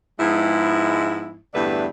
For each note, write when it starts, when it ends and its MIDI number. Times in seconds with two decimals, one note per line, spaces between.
0.19 1.38 44
0.19 1.38 53
0.19 1.38 56
0.19 1.38 59
0.19 1.38 64
1.54 1.86 40
1.54 1.86 43
1.54 1.86 50
1.54 1.86 57
1.54 1.86 71
1.54 1.86 74